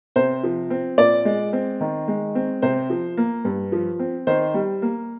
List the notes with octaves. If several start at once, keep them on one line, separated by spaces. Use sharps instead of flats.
C3 C5
F3
C4
A#2 D5
G#3
C4
D#3
G#3
C4
C3 C5
F3
A#3
G2
F3
C4
D#3 C5
G3
A#3